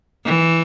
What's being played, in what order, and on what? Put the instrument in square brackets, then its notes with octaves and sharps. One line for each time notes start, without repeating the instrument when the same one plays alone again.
[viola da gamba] E3